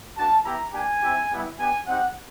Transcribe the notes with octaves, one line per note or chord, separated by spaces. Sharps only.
A#3 D4 F#4 A5
B3 E4 G4 A#5
A#3 D4 G4 G#5
C4 E4 G4
G3 B3 E4 G4
B3 D4 G4 G#5
C4 D#4 G4 F#5